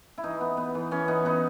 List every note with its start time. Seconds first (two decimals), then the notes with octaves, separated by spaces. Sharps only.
0.18 E4
0.23 E3 D#4
0.41 B3
0.57 B3
0.75 E3
0.91 E3 C#4
1.08 B3 D#4
1.25 B3 D#4